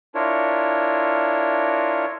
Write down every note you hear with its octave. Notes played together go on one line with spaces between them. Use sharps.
D4 E4 F4 A#4 C#5